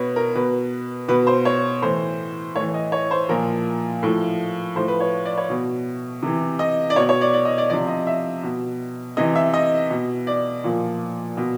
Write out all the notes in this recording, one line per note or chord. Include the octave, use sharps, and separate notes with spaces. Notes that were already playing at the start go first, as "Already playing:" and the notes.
Already playing: B2 B4 C#5
A#4
B2 B4
B2 B4
C5
C#5
A2 E3 C5
A2 E3 C#5
D#5
C#5
C5
A#2 F3 A#4
A2 F3
A2 F3 C5
B4
C#5
D5
C#5
B2
C3 E3
D#5
D5
B2 C#5
C#5
D5
D5
D#5
D5
C3 F3 D5
D#5
E5
B2
C3 E3 D#5
E5
D#5
B2
D5
A#2 F3
B2